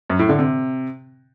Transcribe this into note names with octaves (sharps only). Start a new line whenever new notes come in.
F#2
A2
D3
C3